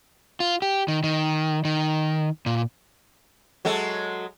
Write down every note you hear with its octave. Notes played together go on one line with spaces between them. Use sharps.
F4
G4
D#3
D#3
D#3
A#2
F#3 G#3 A4